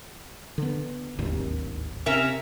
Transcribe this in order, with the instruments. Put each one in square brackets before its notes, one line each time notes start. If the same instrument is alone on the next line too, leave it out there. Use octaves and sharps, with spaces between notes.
[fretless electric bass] D3 B3
D1 G#1 D#2
[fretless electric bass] C3 [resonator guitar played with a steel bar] C#4 A#4 E5